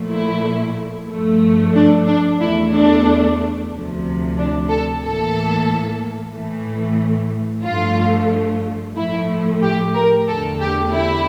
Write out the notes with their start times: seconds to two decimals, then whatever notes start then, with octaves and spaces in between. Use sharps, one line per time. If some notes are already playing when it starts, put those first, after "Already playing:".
Already playing: A#2 F3 A3
0.11 E4
1.09 G2 F3 A3
1.75 D4
2.08 D4
2.41 E2 E3 A3 E4
2.74 D4
3.72 D2 C3 F3
4.38 D4
4.71 A4
5.03 A2 E3 A#3 A4
6.34 A2 E3 A3
7.65 G2 F3 A3 F4
8.96 A2 F3 A3 E4
9.63 G4
9.95 A#4
10.28 E2 D3 A3 A4
10.60 G4
10.93 E4